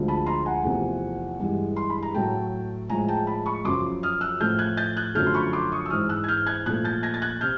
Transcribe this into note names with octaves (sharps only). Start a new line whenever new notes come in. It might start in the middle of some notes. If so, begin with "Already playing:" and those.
Already playing: D2 D3 F3 G#3
A5 B5
A#5 C6
F#5 G#5
E2 C3 F3 A3
G2 E3 G#3
C6
B5
A#5
A2 F#3 A3 G5 A5
A2 F3 G#3 G#5 A#5
G5 A5
A5 B5
B5 C#6
F#2 C#3 F3 C6 D6
D#6 F6
E6 F#6
A2 F3 A3 F6 G6
F#6 G#6
G6 A6
F#6 G#6
F#2 D3 F3 A3 F6 G6
C6
B5 C#6
C6 D6
C#6 D#6
E6
G#2 E3 G#3 D#6 F6
E6 F#6
G#6
F6 G6
F#6 G#6
A#2 F3 A3 F#6 G#6
G6 A6
G#6 A#6
A6
F#6 G#6
C3 F6 G6